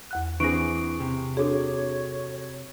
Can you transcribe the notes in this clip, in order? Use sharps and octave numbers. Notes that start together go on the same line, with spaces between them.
E2 F#5 F#6
E3 C4 D4 G#4 C#6 A#6 D7
C3
D4 F#4 G#4 A4 C#5